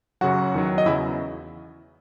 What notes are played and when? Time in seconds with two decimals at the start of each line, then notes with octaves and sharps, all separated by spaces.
0.21 F#2 C#3 F#3 F#4 F#5
0.54 E2 D#3 F#3
0.78 D#5
0.86 E2 C#3 F#3 E4 E5